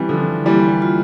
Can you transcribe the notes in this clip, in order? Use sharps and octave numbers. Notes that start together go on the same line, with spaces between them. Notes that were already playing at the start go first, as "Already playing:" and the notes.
Already playing: E3 G3 C4
D3 F3 E4
E3 G3 A#3
F4